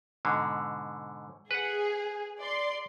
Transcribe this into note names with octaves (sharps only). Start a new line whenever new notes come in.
G#2 B2 D3
G#4 B4 F#5
D5 C6